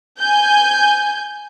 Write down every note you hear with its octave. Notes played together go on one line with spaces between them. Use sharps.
G#5 G6